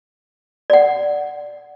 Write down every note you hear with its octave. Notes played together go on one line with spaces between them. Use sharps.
D5 F#5